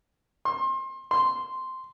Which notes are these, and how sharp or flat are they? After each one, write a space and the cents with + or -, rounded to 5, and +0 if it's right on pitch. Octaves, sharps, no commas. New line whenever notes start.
C6 +30
C6 -5